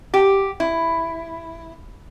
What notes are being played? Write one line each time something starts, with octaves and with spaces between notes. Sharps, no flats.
G4
E4